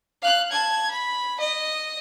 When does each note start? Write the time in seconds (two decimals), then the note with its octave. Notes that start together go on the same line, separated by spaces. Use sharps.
0.22 F5 F#6
0.51 A5 G#6
0.91 B5
1.40 D#5